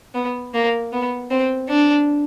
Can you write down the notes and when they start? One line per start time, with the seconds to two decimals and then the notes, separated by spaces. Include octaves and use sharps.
0.14 B3
0.54 A#3
0.93 B3
1.31 C4
1.69 D4